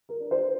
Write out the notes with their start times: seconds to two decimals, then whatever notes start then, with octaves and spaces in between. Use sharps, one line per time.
0.09 A#4
0.20 D4
0.31 C5